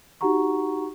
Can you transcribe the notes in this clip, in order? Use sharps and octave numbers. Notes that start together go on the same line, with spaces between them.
D#4 F#4 G4 F#5 A#5 C#6